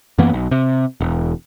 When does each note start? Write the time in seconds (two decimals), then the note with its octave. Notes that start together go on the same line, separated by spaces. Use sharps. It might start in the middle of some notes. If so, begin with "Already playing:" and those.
0.18 F#2 E3 A#3 B3
0.33 B1
0.51 C3
1.01 E1